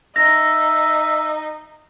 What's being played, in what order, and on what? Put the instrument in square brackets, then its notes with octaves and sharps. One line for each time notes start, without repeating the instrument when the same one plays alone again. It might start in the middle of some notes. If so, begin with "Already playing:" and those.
[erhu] D#4 [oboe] E5 [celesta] A#6